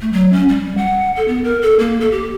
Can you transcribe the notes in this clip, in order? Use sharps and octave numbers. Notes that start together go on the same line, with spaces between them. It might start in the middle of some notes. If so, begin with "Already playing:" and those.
A3
F#3
C#4
G3
F#5
A4
B3
A#4
A4
A#3
A4
G4